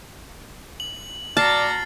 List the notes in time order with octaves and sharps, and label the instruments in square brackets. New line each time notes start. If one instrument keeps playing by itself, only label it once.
[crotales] F#7
[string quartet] A#2 F#4 A#5 [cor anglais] D5 [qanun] A5 [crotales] F6 A6 C7